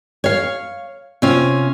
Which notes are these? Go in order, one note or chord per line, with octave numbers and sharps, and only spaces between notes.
C#5 F5
C3 C#4 F4